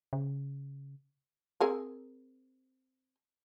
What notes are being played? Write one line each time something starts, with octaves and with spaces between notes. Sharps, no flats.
C#3
C4 G#4 A#4